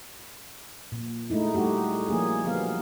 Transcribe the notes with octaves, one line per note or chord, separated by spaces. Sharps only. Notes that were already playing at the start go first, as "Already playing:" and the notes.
A#2
G#3 A3 D#4 E4
G3 A3 D#4 F#4 G4
F3 A#3 C#4 G#4
D3 F#3 B3 G#4 F5